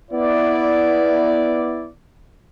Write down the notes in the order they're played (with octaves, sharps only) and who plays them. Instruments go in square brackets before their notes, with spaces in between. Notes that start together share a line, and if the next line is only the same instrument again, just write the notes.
[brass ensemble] B3 E4 D5